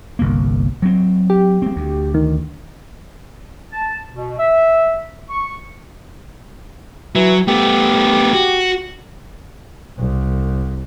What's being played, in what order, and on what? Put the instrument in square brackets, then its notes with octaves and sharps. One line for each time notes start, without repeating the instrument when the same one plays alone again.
[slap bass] G1 C2 A#3
F#3 C4
[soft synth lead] G4
[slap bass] G#3 C4
D2
[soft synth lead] D#3
[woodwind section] A5
B2
E5
C#6
[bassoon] E3 [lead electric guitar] F#3
[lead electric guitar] A3 B3 [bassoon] G4
[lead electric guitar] F#4
[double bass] C2